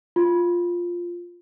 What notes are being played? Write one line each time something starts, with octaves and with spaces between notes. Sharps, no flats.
F4